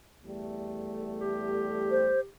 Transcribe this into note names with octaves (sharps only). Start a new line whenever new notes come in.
E2 G3 A3
G4
C5